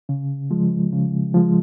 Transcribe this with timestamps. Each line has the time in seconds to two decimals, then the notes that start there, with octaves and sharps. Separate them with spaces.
0.09 C#3
0.51 F3 G#3
0.92 C#3
1.34 F3 G#3